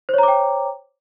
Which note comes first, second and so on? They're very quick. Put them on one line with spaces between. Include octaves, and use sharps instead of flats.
C5 C#5 A#5 D6 G5